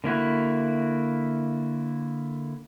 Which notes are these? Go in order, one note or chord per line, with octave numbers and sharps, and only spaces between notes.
D3 A#3 E4 F#4